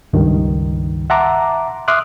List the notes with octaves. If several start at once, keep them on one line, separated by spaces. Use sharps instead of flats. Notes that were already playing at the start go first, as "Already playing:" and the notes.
C#2 G2 D#3
E5 F#5 A5 A#5 C6 D6
E5 C6 D6 D#6 F6 F#6